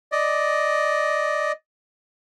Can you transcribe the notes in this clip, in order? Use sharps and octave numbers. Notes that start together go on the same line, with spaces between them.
D5 D#5